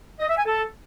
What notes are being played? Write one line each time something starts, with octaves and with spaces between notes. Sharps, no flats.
D#5
E5
G#5
A4